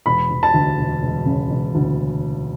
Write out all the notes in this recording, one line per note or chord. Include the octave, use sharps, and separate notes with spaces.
E1 B5
E1
A5
D2
E1
E1
C#3
E1
D2